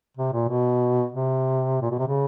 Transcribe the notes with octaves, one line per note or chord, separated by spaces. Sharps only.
C3
A#2
B2
C3
A#2
B2
C3
C#3